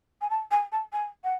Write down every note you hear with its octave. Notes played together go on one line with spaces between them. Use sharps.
G#5
A5
G#5
A5
G#5
F#5